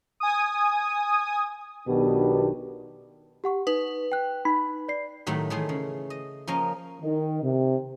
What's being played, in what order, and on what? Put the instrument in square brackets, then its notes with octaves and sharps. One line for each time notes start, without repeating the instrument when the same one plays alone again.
[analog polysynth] G#5 D#6
[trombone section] B1 B2 D#3 B3 D4 G4
[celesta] G4 F#5 C#6
[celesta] D#4 D#6 [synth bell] B4
[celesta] G5 F#6
[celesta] D#4 [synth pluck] B5
[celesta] D5 C7
[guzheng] A2 D#3 F#3 A3 G4 B5
D#3 E3 A3 G#4 C5
C#3
D#5
F3 A#3 C#4 A#4 D#5
[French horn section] D#3
C3